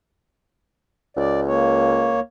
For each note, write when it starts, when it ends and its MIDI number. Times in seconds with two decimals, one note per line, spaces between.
1.17 2.19 37
1.17 1.40 74
1.47 2.20 58
1.47 2.20 73